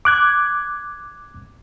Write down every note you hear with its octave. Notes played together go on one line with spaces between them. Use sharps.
D6 F#6 G#6